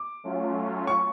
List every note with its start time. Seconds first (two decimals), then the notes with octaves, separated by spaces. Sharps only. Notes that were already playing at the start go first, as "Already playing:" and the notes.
Already playing: D6
0.24 F#3 A3 C#4 F4
0.87 C#6